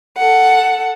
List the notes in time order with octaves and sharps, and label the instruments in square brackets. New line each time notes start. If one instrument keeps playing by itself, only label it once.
[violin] A4 F#5